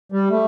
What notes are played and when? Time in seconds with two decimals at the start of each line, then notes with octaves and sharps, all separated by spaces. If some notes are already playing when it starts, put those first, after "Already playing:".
0.12 G3
0.30 A3